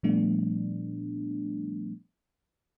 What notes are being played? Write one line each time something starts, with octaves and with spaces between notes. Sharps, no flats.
A#2 F3 G3 A3 B3 D4